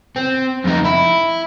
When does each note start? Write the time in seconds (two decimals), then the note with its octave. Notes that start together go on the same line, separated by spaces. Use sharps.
0.16 C4
0.65 F2 D#4
0.85 E4